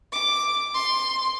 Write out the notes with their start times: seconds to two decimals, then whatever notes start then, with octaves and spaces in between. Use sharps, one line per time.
0.13 D6
0.74 C6